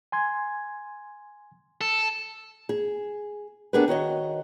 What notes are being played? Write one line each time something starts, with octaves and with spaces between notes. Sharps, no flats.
G#5 C6 G#6
A4
G#4
B3 D4 G4 G#4 A#4 B4
D#3 F#4 C#5 D#5